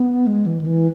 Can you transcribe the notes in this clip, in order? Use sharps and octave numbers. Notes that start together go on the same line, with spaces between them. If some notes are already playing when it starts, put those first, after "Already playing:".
Already playing: B3
G#3
E3
D#3
E3